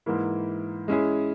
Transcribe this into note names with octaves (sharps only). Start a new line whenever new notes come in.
G#2 E3 A#3 E4
G#3 C#4 E4 G#4